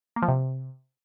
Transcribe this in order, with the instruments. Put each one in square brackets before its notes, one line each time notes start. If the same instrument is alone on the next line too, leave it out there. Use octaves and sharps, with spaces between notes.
[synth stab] A#3
F3
C3